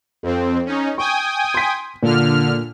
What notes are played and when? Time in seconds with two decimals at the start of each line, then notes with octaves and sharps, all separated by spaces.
0.23 F2 C4 A4
0.66 C#4 D#4
0.98 G5 G#5 C#6 D#6
1.54 C6 B6
2.03 A#2 D3 F6